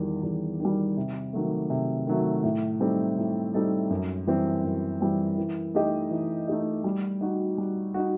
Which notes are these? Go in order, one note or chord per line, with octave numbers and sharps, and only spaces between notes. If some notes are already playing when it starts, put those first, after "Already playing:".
Already playing: E2 D#3 G3
E2
D#3 G3
C3
D#3 F#3 A3
C3
D#3 F#3 A3
A2
G3 C4 D#4 A4
A2
G3 C4 D#4 A4
F#2
E3 G3 C4
F#2
E3 G3 C4
E3
A3 D#4 G4 D#5
E3
A3 D#4 G4 D#5
G3
D#4 F#4
G3
D#4 F#4